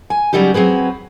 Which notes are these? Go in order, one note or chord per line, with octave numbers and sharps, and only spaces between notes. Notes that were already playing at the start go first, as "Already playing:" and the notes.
G#5
C#3 F#3 G3 D#4 G4
F#3 C4 G#4 B4